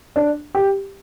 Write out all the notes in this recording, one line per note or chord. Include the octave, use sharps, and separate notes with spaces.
D4
G4